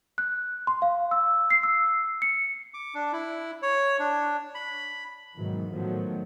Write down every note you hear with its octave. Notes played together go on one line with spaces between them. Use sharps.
F#6
C6
F5
E6
C7
E6
C#7
D6
D4
E4
C#5
D4
B5
G#2 B2 D#3 E3 F#3
A2 D#3 F3 F#3 A3 B3